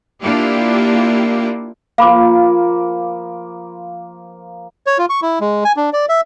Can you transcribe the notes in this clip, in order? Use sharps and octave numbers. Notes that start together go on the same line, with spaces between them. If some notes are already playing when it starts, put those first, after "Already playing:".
A#3 D4 E4 F4 G4
F3 A#3 F5 B5 D6
C#5
F4
C#6
E4
G#3
G#5
D4
D5
E5